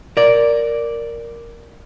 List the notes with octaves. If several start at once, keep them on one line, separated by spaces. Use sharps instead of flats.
A#4 D5